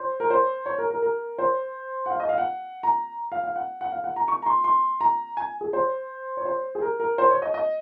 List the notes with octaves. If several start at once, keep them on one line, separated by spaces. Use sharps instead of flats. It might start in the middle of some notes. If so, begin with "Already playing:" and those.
Already playing: C5
A#4
C5
C#5
A#4
A#4
A#4
C5
F#5
F5
D#5
F5
F#5
A#5
F5
F5
F#5
F#5
F5
F#5
A#5
C#6
A#5
C6
C6
A#5
G#5
G#4
C5
C#5
C5
G#4
A#4
A#4
C5
C#5
D#5
D#5